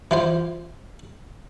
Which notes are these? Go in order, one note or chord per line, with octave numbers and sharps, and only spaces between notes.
E3 F4 C5